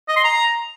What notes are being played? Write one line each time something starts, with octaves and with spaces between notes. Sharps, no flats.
D#5
C6
A#5